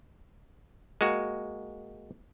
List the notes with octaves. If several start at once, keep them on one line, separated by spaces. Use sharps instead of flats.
G#3 A#3 F#4